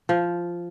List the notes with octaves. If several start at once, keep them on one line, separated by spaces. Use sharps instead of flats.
F3